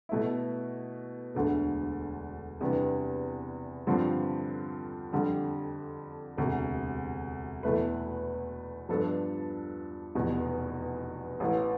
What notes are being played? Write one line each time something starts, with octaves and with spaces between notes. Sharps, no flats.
B2 A3 E4
E1 D2 D3 A3 D4
E2 C3 G3 B3 D4
G2 D3 F3 C4 F4
F2 D3 G3
E1 D2 C3
E2 B2 A3 E4 B4
G2 F3 B3 D4 A4
F1 E2 B2
A1 A2 E3